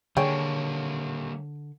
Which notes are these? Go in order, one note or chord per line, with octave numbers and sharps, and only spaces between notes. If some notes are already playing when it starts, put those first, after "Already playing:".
D3 G3 A#3 G#4 C#5 G5 C#6